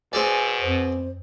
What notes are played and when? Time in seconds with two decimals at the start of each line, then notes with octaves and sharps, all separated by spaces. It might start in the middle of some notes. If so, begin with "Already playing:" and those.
0.13 B2 C4 G#4 D5 G#5
0.61 F2 C5